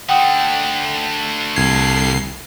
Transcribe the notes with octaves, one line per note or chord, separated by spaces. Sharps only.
D3 A3 F#5 G5 D#6
C2 G#6 C7